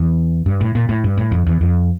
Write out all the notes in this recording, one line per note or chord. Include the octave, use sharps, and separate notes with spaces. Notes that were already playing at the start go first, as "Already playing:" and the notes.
Already playing: E2
G2
A2
A#2
A2
G2
A2
F2
E2
F2